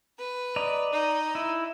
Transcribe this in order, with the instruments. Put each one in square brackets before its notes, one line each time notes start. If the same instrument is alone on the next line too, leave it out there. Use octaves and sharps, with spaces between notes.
[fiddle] B4
[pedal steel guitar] D5 D#5 A#5
[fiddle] D#4
[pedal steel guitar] E4